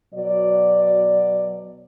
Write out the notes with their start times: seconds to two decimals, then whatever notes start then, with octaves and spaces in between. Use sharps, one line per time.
0.14 B2 F#3 F#4 D5